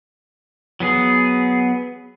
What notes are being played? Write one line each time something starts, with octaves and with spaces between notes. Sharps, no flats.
F#3 B3 G#4